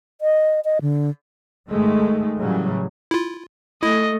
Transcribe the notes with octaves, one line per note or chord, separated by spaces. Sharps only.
D#5
D#5
D3
G#2 D#3 G#3 A3
A2 C#3 E3 F#3 G3
E4 F4
A3 E4 D#5